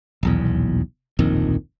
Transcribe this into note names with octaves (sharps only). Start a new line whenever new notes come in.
D#1 B1 E2
D1 A#1 F2 D#3